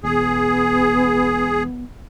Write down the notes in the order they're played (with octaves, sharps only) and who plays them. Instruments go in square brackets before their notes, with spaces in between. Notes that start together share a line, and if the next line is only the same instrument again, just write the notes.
[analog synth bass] E1 [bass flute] B3 [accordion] G#4